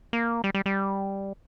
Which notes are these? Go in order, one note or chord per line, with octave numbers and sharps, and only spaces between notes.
A#3
G3
G3
G3